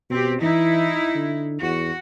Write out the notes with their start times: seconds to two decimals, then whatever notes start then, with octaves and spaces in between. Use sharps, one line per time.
0.10 B2 C4 G4
0.41 E3 D#4 E4
1.15 D3
1.62 E2 F#4